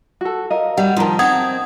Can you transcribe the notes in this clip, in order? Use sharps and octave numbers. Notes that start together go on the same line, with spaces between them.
F#4 A4
A#4 D#5 F5
G3 F#5
D#3 F3 D#4 A#4 A5
C4 F#5 D#6 G#6